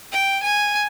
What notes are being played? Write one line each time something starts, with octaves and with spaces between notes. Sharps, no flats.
G5
G#5